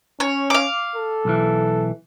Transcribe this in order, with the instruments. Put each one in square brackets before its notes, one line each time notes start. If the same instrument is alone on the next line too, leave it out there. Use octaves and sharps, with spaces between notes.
[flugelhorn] C#4 [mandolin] C#5
[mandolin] F5 D6
[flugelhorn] A4
[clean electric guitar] B1 E3